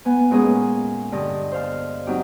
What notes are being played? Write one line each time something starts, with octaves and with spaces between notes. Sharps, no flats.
B3 G#5
A#2 G#3 B3 C#4 G#4
G2 D3 D#5 A5
C5 F5 A5
F#3 C4 D#4 G4